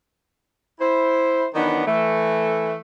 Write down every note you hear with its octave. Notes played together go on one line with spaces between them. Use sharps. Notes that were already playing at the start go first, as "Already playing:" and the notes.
E4 C5
D#3 E3 F#3 B3 D4 D#4
E3 A3